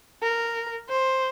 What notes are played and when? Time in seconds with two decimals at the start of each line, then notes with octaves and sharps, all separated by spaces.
0.22 A#4
0.89 C5